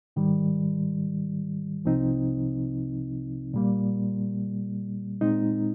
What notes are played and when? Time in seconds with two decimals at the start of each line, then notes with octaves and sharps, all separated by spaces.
0.16 G#2 D#3 G3
1.85 C2 C3 F3 C4 D#4
3.54 A#2 G3 A#3
5.21 A#2 G#3 C4 D#4